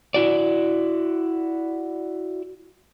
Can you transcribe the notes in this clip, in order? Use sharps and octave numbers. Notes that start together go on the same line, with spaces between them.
E4 F#4 D5